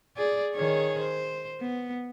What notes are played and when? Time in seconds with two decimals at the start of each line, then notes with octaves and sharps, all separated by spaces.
0.17 G#4 D5
0.55 D#3 G#4 C#5
0.99 C5
1.60 B3